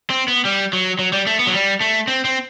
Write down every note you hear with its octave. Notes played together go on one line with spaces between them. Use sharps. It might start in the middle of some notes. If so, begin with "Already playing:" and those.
C4
B3
G3
F#3
F#3
G3
A3
B3
F#3
G3
A3
C4
C4